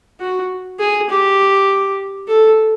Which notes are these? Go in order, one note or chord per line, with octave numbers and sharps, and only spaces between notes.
F#4
G#4
G4
A4